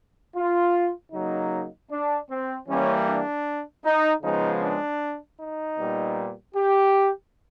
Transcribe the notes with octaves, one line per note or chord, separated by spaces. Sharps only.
F4
C#3 F#3 A#3 D#4
D4
C4
E3 G3 A#3 C#4
D4
D#4
C#3 F3 G#3 B3 D#4
D4
D#4
A#2 G3 B3
G4